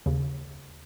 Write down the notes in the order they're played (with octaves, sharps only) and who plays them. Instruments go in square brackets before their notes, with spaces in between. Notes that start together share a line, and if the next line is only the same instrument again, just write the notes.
[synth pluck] D#2 C#3